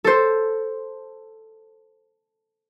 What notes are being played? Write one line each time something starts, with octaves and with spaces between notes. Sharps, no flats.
A4 C5